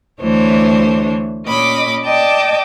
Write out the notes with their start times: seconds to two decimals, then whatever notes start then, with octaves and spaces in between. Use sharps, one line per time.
0.22 D2 E3 A3 D4 C5 C#5
1.46 A#2 C#4 D#5 B5 D6
2.04 D5 D#5 G5 A5 D6